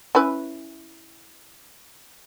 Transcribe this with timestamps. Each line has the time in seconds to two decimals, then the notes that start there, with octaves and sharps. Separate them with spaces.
0.15 C#4 E4 B4